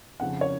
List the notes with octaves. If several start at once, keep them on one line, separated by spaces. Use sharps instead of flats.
F2 C#3 F3 F#5
C#5